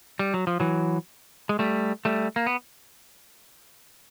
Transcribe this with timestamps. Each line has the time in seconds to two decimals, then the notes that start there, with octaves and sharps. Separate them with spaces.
0.19 G3
0.34 F#3
0.47 F3
0.60 E3 F#3
1.49 G#3
1.59 G3 A3
2.05 G3 A3
2.36 A#3
2.46 B3